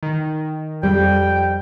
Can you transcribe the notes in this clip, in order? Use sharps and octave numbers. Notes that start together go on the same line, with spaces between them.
D#3
F2 G3 G5